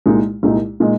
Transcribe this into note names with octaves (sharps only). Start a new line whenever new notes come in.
C2 A#2 G#3 D#4
C2 A#2 G#3 D#4
A#2 G#3 D#4